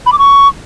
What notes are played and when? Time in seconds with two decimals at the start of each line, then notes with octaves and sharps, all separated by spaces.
0.06 B5
0.12 D6
0.19 C#6